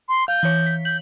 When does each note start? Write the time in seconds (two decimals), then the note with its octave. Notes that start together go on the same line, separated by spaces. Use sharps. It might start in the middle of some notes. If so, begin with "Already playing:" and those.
0.09 C6
0.28 F5 G6
0.43 E3 C#5
0.67 B6
0.85 G6 F#7